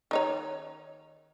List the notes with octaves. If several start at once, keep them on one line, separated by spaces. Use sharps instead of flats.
D#3 D#4 C#5